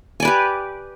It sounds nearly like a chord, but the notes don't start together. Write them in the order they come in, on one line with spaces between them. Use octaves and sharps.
G#5 D5 B4 G4